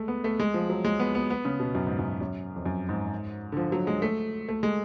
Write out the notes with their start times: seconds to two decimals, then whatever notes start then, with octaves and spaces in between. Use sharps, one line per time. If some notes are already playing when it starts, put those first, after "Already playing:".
Already playing: G#3 A3
0.08 B3
0.24 A3
0.40 G#3
0.54 F3
0.70 F#3
0.85 G#3
1.00 B3
1.15 B3
1.30 B3
1.45 C#3
1.60 B2
1.75 F#2
1.87 G#2
1.99 F#2
2.21 F#2
2.56 F2
2.66 F#2
2.89 G#2
3.52 D3
3.57 F3
3.72 F#3
3.87 G#3
4.02 A3
4.48 A3
4.63 G#3